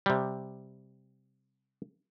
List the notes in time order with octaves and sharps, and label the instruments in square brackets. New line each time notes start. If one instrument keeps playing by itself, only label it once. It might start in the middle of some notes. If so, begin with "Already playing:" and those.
[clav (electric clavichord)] C3 G3